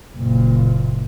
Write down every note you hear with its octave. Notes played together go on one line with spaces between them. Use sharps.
F#1 A#2